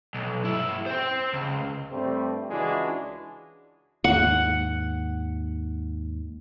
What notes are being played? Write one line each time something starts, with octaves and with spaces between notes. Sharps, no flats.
B1
G2 E4
C5 G5
C#2
G2 G3 A3 C4
C#2 E3 G#3 D4 F#4
D#2 G#2 F#5